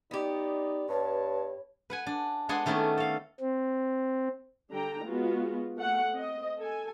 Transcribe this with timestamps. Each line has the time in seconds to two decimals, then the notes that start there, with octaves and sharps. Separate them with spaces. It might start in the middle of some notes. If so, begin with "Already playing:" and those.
0.11 B3 D#4 G4 D5
0.89 G2 B4 C#5 A5
1.90 B4 F#5 G#5
2.07 D4
2.49 G#3 B3 D4 F#5 G#5 C6
2.66 D#3 A3 B3 C#4 D4
2.98 A4 F5
3.40 C4
4.72 D3 G3 D4 G5 A#5
5.04 G#3 B3 F4 F#4
5.78 A3 F#5
6.14 C4 D#5
6.60 A4 G#5